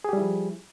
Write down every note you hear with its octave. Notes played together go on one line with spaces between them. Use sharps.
F3 G3 E4 G4 G#4